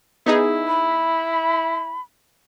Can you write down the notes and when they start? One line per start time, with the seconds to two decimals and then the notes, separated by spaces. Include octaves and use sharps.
0.26 B3 D#4 E4 G#4
0.68 B5